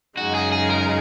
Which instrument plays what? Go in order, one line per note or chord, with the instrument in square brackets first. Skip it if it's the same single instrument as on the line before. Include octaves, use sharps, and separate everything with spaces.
[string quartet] F#2 C#3 G#3 D#4 [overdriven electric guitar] F#4
[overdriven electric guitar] G#4
G#4
A#4